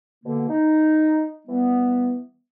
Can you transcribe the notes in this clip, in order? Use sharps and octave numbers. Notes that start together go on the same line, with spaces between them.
B2 D3 A#3
D#4
E3 G3 B3